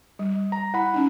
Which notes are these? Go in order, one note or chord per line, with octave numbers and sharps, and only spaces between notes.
G3
A#5
E4 F#5 B5
C#4 D#4